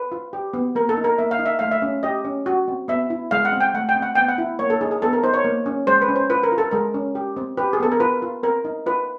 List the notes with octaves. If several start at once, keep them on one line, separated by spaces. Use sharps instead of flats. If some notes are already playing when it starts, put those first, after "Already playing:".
Already playing: B4
F4
G4
B3
A#3 A#4
A4
D#4
A#4
A#3 E5
F5
D#4
E5
A3 F5
E5
C#4
G4 D#5
C#4
F#4
C4
B3 E5
E4
G#3 F5
F#5
C4
G5
A3 F#5
G5
C4
F#5
B3 G5
F#5
E4
A#3 C#5
A4
D#4 G#4
G#4
B3 A4
A#4
D#4 C5
C#5
A#3
C#4
G#3 C5
B4
C#4
C5
F4 B4
A#4
F4
A4
G#3 A#4
C#4
G4
C4
G4 B4
G#4
B3 A4
A#4
F4 B4
F4
C4 A#4
D#4
F4 B4